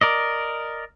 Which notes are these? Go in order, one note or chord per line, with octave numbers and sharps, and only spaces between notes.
A#4 D5 D#5